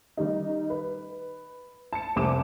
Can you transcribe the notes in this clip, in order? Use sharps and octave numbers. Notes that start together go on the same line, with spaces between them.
D#3 G3 D#4
B4
A5 C#7
F1 C2 C5 G#5 D6 E7